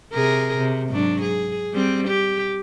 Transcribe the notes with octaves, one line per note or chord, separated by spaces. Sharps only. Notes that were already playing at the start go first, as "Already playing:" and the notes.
C3 G#4 A#4
C3
G#2 F#3 D4
G#4
G3 C4
G4